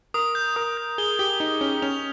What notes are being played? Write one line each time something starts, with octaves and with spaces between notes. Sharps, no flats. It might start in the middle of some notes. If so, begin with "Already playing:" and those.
A#4 D#6
G6
A#4 D#6
G6
G#4 G7
G4 G7
D#4 G7
C#4 G7
C#4 F7